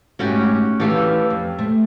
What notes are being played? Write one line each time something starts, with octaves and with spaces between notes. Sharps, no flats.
G#2 A3 C#4 E4 F#4 G4
E3 A3 B3 G4 A4 F5
F2
A3 C4